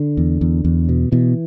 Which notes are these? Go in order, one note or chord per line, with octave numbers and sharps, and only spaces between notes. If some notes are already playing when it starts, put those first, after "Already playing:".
Already playing: D3
E2
E2
E2
B2
B2 E3